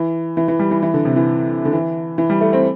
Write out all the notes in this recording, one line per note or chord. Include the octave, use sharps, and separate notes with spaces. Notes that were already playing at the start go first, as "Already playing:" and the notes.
Already playing: E3
E3
E3
G3
E3
E3
D3
C3
E3
D3
E3
E3
G3
A3
C4